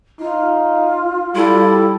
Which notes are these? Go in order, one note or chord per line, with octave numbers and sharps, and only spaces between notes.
D#4 F4
G3 E4 A4